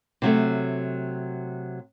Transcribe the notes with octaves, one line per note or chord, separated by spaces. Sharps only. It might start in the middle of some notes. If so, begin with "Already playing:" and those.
C3 F#3 A3